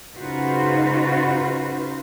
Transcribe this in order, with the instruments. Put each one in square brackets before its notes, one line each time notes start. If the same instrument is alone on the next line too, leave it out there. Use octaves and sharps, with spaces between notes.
[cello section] C#3 D#4 F4 F#4 B4 C5